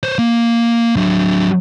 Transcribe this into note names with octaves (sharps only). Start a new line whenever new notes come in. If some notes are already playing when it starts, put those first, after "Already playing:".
C5 C#5
A#3
F#3 D4